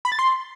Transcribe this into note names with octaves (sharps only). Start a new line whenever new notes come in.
B5
A6
C6